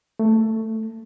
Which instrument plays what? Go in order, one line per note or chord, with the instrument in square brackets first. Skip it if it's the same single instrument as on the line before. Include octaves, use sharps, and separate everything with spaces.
[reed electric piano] A3